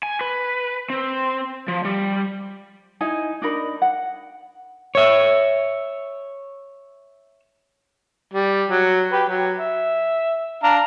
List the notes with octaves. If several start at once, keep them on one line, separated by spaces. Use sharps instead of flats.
G#5
B4
C4
F3
G3
D#4 E4 G#5
D4 D#4 A#4 B5
F#5
C#5 E5
G3
F#3
G4 B4
F#3
E5
D4 F5 A#5